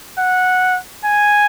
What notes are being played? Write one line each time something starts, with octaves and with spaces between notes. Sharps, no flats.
F#5
G#5